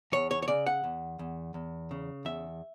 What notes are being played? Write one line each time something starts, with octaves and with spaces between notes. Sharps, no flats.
E2 C#5
C#5
C#5
C#3 D5
F#5
E2
E2
E2
C#3
E2 E5